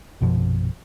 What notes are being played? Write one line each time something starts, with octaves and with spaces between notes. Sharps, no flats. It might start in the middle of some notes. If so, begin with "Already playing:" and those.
A#1 F#2 B2 F3